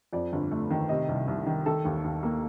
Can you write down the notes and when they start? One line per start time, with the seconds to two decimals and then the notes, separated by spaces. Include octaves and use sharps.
0.13 F2 D5
0.33 G1
0.51 A3
0.70 D#3
0.89 C3 D#5
1.09 C2
1.28 C2
1.47 D#3
1.66 D#3 A4
1.85 D#2
2.04 D#2
2.23 A#3